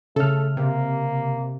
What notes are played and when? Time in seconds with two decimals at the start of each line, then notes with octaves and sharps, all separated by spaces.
0.16 C#3 A3 A4 F6
0.57 C3 A#3